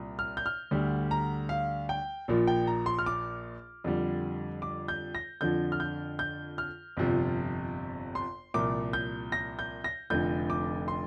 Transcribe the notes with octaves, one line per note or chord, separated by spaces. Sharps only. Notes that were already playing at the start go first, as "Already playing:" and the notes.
Already playing: C2 A#2 G3
F6
G6
F6
D2 D3 G3
A#5
F5
G5
A#1 A#2 F3
G5
A#5
C6
F6
D6
F2 D3 G3
D6
G6
A#6
F2 D3 F3 G6
F6
G6
G6
F6
G1 F2 C3 F3
C6
C2 A#2 F3 D6
G6
A#6
G6
A#6
F1 F2 D3 G6
D6
C6